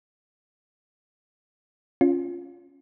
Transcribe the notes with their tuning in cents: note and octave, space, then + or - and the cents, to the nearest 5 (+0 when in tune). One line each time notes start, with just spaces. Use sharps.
C#4 +0 F4 +0